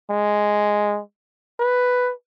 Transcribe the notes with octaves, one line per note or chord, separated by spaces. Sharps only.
G#3
B4